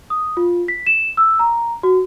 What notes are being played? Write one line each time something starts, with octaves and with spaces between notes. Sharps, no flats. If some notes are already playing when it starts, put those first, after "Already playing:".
D#6
F4
B6
E7
E6
A#5
F#4